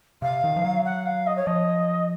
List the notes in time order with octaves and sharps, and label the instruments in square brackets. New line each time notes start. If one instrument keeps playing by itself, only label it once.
[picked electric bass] C3 [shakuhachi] F5
[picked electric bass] D#3
F3
F#3
[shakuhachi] F#5
F5
D#5
C#5
[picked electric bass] F3 [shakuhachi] D#5